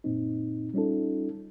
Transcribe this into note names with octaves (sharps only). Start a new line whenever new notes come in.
F#2 A#2 C4 D#4
G3 C#4 D#4 F4 A4